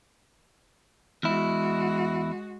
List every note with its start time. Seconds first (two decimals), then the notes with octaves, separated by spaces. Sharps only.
1.23 E2 G#3 E4 F#4